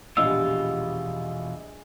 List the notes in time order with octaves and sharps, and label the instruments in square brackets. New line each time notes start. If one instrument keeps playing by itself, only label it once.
[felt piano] A#1 D#5 [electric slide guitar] E2 B2 F4 [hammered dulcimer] G3 G#4 [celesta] E6